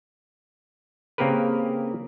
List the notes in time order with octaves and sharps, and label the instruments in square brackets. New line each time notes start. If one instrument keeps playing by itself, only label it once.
[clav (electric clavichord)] C#3 A#3 C4 G4 A#4 B4